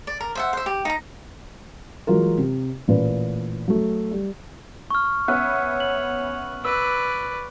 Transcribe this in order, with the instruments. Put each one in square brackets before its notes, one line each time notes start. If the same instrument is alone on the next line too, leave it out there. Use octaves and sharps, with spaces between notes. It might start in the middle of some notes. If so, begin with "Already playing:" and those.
[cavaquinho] D5
A#4
C5 E5 F#5
C5 E5
G4
D#4 A#5
[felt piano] E3 F#3 G#3 F4 A#4
C3
A1 A#2 B4
F#3 A3
G3
[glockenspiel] C#6 F6
[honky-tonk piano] B3 C#4 E5 [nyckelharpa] C#5 [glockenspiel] F#6
[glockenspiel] F#7
[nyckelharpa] B4 D5 [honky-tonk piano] E6